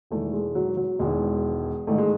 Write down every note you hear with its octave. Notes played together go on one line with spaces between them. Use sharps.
E1 E2 D#3 A3
G#3
F#3
F#3
E1 E2 D#3 G#3
A1 G#2 D#3 A3
G#3